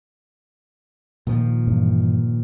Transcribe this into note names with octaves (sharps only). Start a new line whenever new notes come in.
A#2 D#3 F3
G2 E3